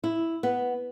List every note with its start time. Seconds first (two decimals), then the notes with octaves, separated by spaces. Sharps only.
0.04 E4
0.43 B3